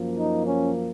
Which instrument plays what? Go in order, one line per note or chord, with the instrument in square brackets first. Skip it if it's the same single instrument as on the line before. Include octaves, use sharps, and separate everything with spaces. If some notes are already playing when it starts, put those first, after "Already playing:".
Already playing: [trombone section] F#2 F3 A#3
D#4
C#4